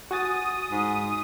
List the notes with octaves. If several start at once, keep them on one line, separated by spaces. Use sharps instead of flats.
F#4 G#5 D#6 A6
G#2